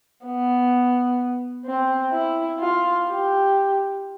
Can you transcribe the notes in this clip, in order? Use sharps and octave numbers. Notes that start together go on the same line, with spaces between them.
B3
C4
E4
F4
G4